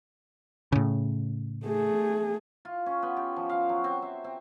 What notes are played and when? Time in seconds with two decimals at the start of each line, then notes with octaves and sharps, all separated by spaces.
0.72 A2 C#3
1.65 A3 G#4
2.65 F4
2.86 C#4
3.02 B3
3.17 G4
3.36 F3
3.49 F5
3.69 F#3
3.84 C4
4.02 E5
4.24 C4